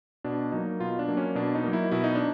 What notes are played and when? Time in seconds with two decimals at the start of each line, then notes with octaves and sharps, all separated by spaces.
0.24 B2 D4
0.52 F#3 A#3 D#4
0.80 B2 F4
0.99 D4
1.08 F#3 A#3
1.17 C#4
1.35 B2 D4
1.55 D#4
1.64 F#3 A#3
1.73 E4
1.91 B2 E4
2.04 D#4
2.15 D4